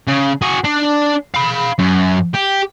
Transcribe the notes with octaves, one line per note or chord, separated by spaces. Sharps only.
C#3
F#4 G#4
D4
F5 B5
F#2
G4